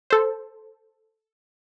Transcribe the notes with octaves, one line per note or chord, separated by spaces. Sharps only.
A4 C5